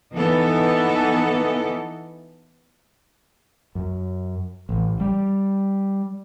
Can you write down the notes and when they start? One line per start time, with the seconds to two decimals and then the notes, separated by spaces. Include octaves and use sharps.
0.16 E3 B3 D#4 A4
3.75 F#2
4.69 A1
5.00 G3